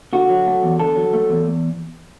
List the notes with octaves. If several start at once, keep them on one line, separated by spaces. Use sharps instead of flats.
D3 F#4
F#3
A3
E2
D3 A4
F#3
A3
E2